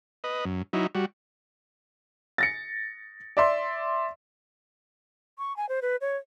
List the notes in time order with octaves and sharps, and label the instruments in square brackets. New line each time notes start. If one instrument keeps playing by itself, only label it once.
[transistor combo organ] B4 D#5
F#2
F#3 D#4 E4
G3 F#4
[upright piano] A6 A#6 C#7
D5 E5 C6
[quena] C#6
G#5
C5
B4
C#5